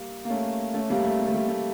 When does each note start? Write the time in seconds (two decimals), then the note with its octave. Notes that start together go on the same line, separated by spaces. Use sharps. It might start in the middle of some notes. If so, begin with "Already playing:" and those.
Already playing: G3 A#3
0.25 A#3
0.30 A3 C#4
0.74 A3 C#4
0.90 G3 A#3
1.04 A3
1.20 G3
1.27 A3
1.34 G3
1.49 A3